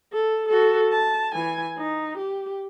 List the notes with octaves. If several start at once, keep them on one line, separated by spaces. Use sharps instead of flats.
A4
F#4 A4
A5
E3 G#5
D#4
G4